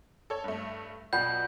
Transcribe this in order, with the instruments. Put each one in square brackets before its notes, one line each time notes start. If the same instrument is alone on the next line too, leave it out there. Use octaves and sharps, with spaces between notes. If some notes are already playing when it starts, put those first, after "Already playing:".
[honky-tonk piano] A4 C#5
G2 A3
[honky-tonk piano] B1 B2 [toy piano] F4 D5 F#5 [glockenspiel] G6